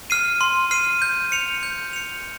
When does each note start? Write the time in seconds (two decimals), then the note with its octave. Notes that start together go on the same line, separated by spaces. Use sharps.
0.10 F6 C7 D#7
0.41 C6
0.71 F6 C7 D#7
1.02 G6
1.32 C#7 F7
1.63 G6
1.93 C#7 F7